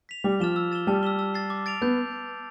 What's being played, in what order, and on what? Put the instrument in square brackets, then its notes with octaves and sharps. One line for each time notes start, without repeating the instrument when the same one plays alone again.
[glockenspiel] B6 F7
[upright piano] G3 [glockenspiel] D6
[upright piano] F3 [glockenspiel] F6 A6 E7 G7
[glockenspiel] E6
A6 E7 G7
[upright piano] G3 [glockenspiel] A5
[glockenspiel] E6 B6 E7 G7
E6
A6 C7
D6
A6 D7 F7
[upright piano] B3 [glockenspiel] G6